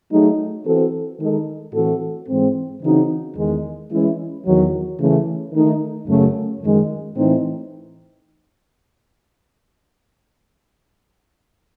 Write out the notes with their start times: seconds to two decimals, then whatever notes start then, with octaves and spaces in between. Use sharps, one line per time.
0.11 F#3 A3 D#4 G#4
0.64 E3 C4 F#4 A4
1.19 D#3 G#3 D#4 A4
1.73 A2 E3 C4 F#4 A4
2.28 G#2 E3 G#3 C4
2.82 C#3 E3 C4 D#4 F#4
3.36 E2 D#3 G#3
3.91 E3 G#3 C#4 E4
4.45 E2 D#3 F#3
4.98 C#3 E3 A3
5.53 D#3 A3 D#4
6.08 F#2 C#3 F#3 A3
6.62 F#2 D#3 G#3
7.16 A2 E3 A3 C4 D#4